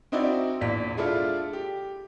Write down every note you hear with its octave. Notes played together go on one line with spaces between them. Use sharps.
C4 D#4 E4 F#4 D5
A#1 E2 B6
G#3 D4 E4 F4 A4
G4